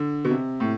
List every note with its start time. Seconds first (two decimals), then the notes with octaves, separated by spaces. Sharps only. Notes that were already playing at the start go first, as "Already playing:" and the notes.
Already playing: D3
0.25 B2
0.31 C3
0.60 A2